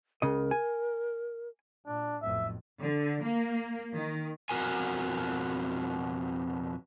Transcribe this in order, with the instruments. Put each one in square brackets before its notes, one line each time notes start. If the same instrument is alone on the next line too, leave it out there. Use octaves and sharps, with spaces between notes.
[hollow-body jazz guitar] C#2 C#3 D#5 [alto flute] A#4
[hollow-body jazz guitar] G#5
[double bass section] A#2 [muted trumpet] D4
[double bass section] B1 F2 A2 [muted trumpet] E5
[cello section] D3
A#3
D#3
[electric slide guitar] F2 B2 G3 F#4 A#4 G#5